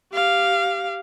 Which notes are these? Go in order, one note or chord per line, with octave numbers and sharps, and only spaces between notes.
G4 F5